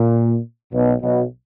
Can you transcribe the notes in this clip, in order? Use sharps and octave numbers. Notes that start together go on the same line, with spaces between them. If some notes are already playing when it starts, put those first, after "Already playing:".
Already playing: A#2
B1 B2
B1 B2